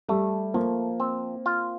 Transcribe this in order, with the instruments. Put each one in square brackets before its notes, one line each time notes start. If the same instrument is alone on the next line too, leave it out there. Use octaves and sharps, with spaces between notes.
[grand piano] G3 [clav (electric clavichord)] A3
[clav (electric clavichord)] F3 [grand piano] A#3
[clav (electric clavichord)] C4
F4